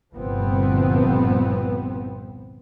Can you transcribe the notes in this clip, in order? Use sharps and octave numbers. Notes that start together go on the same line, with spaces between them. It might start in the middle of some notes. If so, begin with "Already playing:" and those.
G1 C2 A#2 F3 B3 C4